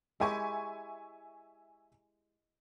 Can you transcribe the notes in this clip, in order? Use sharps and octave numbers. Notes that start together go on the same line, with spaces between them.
G#3 E4 G4 E5 G#5 C#6